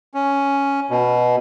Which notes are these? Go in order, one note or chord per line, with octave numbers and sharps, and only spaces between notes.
C#4
B2